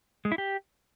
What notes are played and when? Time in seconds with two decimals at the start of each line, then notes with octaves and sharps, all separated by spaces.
0.25 G#3
0.32 E4
0.38 G4